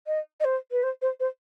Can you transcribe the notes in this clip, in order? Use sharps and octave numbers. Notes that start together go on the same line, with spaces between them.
D#5
D#5
C5
B4
C5
C5
C5